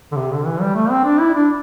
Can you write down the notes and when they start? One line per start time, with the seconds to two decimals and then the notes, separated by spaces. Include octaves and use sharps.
0.12 D3
0.16 C3
0.32 D3
0.46 E3
0.61 G3
0.75 A3
0.90 C4
1.05 D4
1.20 E4
1.35 D4